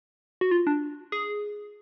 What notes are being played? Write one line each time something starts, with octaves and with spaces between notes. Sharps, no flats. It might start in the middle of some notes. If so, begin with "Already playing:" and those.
F#4
F4
D4
G#4